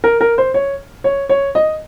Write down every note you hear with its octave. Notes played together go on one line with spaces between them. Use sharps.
A#4
A#4
C5
C#5
C#5
C#5
D#5